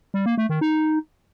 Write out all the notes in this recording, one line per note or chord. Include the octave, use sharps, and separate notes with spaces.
G3
A#3
A3
D#3
D#4